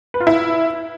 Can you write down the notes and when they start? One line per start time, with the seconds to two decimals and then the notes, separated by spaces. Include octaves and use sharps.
0.14 B4
0.20 F4
0.27 E4